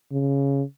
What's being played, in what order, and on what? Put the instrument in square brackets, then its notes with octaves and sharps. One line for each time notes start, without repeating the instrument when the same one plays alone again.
[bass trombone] C#3